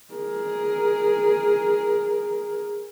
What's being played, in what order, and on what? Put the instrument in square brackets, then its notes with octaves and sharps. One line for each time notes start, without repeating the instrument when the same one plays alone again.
[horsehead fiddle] G#4 A#4